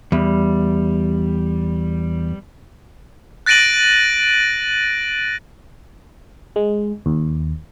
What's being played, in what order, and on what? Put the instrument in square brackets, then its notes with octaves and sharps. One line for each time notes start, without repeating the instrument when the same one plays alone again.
[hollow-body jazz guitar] E2 [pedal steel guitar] G3
[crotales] F#6 A6 A#6 D7 D#7 F#7
[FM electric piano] G#3
D#2